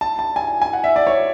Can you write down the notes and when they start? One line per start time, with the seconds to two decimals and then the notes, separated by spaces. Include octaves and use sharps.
0.01 A5
0.19 A5
0.36 G#5
0.62 G#5
0.73 F#5
0.84 E5
0.96 D5
1.07 C#5